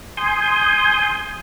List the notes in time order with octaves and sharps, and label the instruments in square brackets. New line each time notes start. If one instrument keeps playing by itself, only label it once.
[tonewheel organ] G#5 C6 D#6 G6